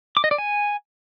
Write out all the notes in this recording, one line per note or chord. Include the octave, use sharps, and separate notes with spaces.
D6
D#5
D5
G#5